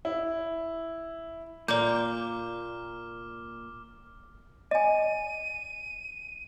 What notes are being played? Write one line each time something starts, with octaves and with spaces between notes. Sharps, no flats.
E4
A#2 A#3 D5 D6 F6 G6
D#5 G#5 D#7